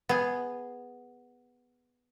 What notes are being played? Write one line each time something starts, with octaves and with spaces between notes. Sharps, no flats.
B3 G#4